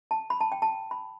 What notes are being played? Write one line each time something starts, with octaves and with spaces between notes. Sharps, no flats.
A5
B5
A5
G5
A5
B5